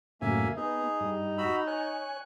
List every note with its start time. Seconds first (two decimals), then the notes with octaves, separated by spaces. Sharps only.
0.21 F#2 A2 C#3 A#3 E5 G#5
0.57 B3 D#4 G#4
1.00 G2
1.38 F#4 B5 E6
1.67 C#5 G#5 F#6